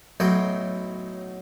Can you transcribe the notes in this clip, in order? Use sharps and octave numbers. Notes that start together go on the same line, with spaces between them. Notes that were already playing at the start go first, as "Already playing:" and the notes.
B1 A2 F#3 G5